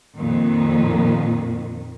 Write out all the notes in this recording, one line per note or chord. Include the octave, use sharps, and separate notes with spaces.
F2 A#2 D#3